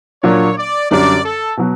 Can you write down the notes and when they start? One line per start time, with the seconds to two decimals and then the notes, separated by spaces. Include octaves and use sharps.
0.23 A#2 F#3 A#3 D4 C#5
0.57 D5
0.91 F#2 D3 G3 D5
1.24 A4
1.57 B2 F#3